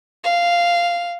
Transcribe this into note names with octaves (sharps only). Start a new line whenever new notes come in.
F5